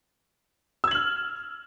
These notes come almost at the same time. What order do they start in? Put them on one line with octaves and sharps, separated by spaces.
E6 G#6 F#7 F6